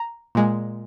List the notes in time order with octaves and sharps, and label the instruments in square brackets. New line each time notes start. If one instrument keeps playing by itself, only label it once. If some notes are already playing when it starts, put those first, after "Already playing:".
Already playing: [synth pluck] A#5
A#2 G#3